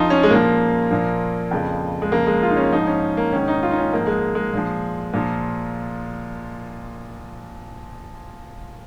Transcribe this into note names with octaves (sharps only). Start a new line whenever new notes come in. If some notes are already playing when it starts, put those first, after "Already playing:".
Already playing: F2 F3 D#4 F4
C#4
G#3
A#2 F3 A#3
A#2 F3
F2 C#3 F3
G#3
F2 C#3 F3 A#3
G#3
F4
D#4
C#4
G#2 F3 D#4
C#4
A#3
G#2 D#3 C#4
D#4
F4
D#4
C#4
G#2 F3 A#3
G#3
G#3
A#2 F3
A#2 F3